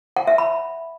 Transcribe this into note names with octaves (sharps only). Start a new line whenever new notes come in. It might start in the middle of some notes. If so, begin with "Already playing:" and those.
F#5
E5
B5